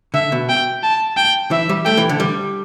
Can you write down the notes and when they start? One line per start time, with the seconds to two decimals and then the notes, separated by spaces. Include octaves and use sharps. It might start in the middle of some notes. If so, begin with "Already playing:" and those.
0.14 D3 E5
0.32 B2
0.49 G5
0.84 A5
1.17 G5
1.51 E3 E5
1.69 G3
1.86 A3 G5
1.97 E3
2.09 D3
2.20 G3